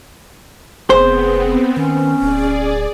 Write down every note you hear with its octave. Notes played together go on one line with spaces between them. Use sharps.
F1 B3 C4 G#4 C5
D#3 C#4
D1 G#4 D5